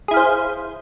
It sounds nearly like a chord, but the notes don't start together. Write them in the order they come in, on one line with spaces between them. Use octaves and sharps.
G#4 E4 F5 C5